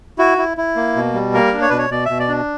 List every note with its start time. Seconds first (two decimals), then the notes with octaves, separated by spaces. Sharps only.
0.18 E4 F#4
0.38 E4
0.57 E4
0.76 A#3
0.96 B2
1.14 G3
1.34 A#3 A#4
1.53 D4
1.62 C#5
1.70 B2 B4
1.78 C#5
1.90 B2 D5
2.05 B2 E5
2.20 D5
2.29 D4